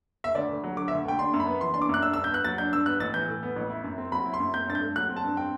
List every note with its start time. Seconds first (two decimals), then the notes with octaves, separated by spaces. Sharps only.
0.24 E5
0.35 D2 D5
0.49 D2
0.64 F#3
0.77 D3 D6
0.88 D2 E5
1.05 D2 G5
1.19 D4 C6
1.34 F#2
1.40 B5
1.47 B3
1.61 E3 C6
1.74 D4 C6
1.82 D6
1.89 F#2 F#6
2.02 D4 E6
2.13 G2 E6
2.24 G6
2.31 B3 F#6
2.44 F#3 A6
2.58 D4 G6
2.72 G2 E6
2.86 B3 F#6
3.00 A1 A6
3.14 E3 G6
3.29 A2
3.43 B3
3.56 A1
3.70 E4
3.84 F#2
3.98 C4
4.12 F#3 B5
4.26 E4
4.34 C6
4.40 F#2
4.54 C4 G6
4.68 G2 A6
4.75 G6
4.81 A3
4.96 F#3 F#6
5.09 C4
5.16 A5
5.24 G2
5.37 C4 G5